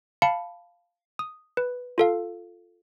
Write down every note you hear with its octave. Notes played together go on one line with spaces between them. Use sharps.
F5 A5 B5 C#7
D#6
B4
F4 A4 F5